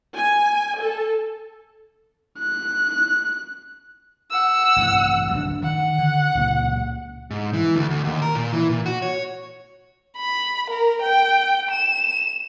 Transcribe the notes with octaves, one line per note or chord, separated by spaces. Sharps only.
G#5
A4
F#6
F#5 E6
A1 G2 C3
D1 F#2 D4
D#3 F#5
D3
C#2 A#2 A#3
G#2
E3
D2
D2
D#2
A#4
A#2
E3
A#2
F#4
C#5
B5
A#4
G5
E7